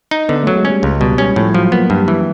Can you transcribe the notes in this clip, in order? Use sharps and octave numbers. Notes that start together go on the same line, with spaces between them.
D#4
D3 B3
F#3 A3
G#3
C#4
G3
C#2 G#3
B2 G3
G3 C#4
A2 F3
F3 F#3
A#3 B3
G2
E3